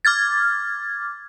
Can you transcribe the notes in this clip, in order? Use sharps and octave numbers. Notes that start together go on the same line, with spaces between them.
D6 F6 G#6 A6